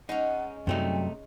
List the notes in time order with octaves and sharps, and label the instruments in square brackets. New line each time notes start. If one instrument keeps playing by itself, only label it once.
[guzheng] G#3 C#4 [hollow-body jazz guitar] D#4 [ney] F#5
[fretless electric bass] F#2 F#3 G3 [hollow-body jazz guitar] C3 A3 D#4 [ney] G5